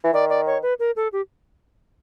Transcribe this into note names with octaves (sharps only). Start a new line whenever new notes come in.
E3
D#3 D5
D5
C#5
B4
A#4
A4
G4